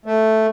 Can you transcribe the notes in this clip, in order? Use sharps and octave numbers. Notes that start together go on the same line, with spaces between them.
A3